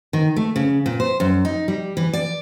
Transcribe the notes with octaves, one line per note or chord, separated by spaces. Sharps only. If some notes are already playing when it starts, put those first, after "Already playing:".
D#3
A3
C#3
A#2
C5
F#2
D#4
G3
E3
D5